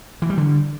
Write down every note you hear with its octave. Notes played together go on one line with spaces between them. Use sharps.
E3
G3
D3